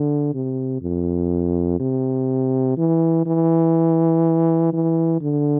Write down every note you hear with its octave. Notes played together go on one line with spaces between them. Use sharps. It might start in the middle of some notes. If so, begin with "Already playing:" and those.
Already playing: D3
C3
F2
C3
E3
E3
E3
D3